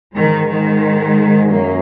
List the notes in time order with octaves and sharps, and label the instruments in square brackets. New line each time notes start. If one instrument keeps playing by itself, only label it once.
[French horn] G#2 [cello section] D#3 G#3
[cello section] D#3 G#3
[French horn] F#2 [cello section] F#3 A#3